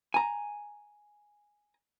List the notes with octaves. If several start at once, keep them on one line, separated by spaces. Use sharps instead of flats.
G#5 A#5